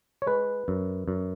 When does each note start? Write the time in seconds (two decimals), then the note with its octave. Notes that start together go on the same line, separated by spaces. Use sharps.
0.22 C#5
0.27 G#3 B4
0.68 F#2
1.08 F#2